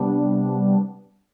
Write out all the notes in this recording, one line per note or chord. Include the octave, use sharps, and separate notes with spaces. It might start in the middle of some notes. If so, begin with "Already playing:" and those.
Already playing: C3 G3 B3 D4